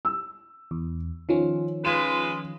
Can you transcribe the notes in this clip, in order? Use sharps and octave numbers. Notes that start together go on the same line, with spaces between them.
E6
E2
D#3 F3 C#4 F4
G#3 F4 B4 E7